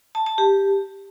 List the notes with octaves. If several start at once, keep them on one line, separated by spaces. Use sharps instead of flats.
A5
A5
G4